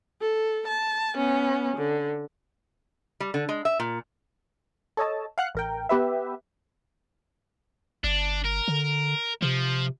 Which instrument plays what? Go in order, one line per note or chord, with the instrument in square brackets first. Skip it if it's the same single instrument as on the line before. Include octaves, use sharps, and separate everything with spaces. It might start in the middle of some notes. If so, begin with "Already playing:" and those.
[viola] A4
A5
B3 C#4
D3
[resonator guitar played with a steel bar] G3
D3
G#3
E5
A#2
[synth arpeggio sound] A4 C#5 D#5 A5
F5 F#5 F#6
A1 A#4 G5
B3 G4 B4 E5
[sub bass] G1 [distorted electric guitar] D4
[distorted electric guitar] A#4
[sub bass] D3
[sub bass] C3 [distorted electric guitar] F3